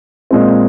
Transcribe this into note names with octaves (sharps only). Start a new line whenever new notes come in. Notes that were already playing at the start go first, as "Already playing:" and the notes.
A#2 G#3 C4